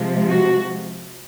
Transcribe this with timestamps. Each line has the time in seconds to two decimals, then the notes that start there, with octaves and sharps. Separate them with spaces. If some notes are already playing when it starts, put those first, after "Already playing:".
Already playing: C3 F3 G#3
0.28 F#4